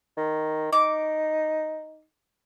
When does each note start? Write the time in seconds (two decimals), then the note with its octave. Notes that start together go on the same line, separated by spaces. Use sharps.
0.17 D#3
0.73 D#4 D6